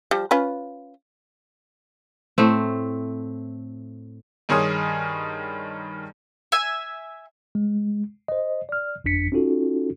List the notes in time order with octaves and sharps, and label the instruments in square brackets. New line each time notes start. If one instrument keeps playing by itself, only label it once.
[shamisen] F3 G3
C#4 F4 B4
[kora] A2 A3 C4
[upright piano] G2 D#3 G#4 C#5 C6 D#6
[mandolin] E5 G#5
[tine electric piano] G#3
C5 D#5
D5 F6
G1 F2 D4 B6 C#7
C#4 D#4 F4 F#4 A4